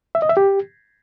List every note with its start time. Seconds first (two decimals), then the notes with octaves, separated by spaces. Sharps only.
0.15 E5
0.22 D#5
0.29 E5
0.37 G4